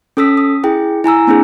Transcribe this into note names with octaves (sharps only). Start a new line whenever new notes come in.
C#4 A4 D#6 E6 B6
D#6
E4 G#4 G5
E4 G#5 A#5 E6
A#3 C4 D4 E4 G#4